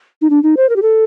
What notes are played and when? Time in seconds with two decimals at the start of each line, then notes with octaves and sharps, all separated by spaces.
0.21 D#4
0.30 D4
0.43 D#4
0.57 C5
0.69 A#4
0.76 G4
0.82 A4